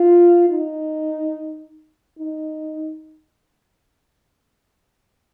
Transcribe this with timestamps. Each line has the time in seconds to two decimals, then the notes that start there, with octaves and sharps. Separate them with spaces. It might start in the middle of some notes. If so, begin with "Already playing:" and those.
Already playing: F4
0.49 D#4
2.18 D#4